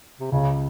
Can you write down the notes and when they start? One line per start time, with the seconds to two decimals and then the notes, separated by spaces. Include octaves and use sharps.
0.20 C3
0.31 C#2 C#3